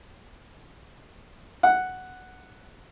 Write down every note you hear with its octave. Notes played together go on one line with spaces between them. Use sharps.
F#5